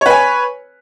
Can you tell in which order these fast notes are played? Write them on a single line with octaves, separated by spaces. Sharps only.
C#5 B4 G#5